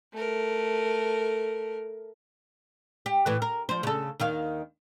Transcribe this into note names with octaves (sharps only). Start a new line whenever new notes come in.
A3 A#4
G4
A2 E3
A#4
F3 C5
C#3 A4
D#2 D#3 F5